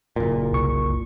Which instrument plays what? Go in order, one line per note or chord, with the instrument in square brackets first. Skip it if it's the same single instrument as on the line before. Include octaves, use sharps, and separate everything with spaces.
[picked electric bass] F#1 A#2
[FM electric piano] C2 C#6